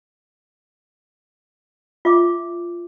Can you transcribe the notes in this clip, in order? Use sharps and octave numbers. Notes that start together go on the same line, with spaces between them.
F4 E5 D6